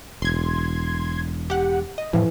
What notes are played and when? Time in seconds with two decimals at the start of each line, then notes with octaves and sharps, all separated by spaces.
0.22 E1 C6 G#6
1.50 G4 F#5
1.98 D#5
2.13 F2 A2 E3 F3